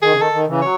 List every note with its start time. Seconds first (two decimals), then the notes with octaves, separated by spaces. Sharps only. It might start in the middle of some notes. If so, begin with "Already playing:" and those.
0.02 D#3 G#4
0.11 C#3
0.16 D#3
0.22 A4
0.32 D#3
0.47 C#3 E3
0.62 F#3 C#5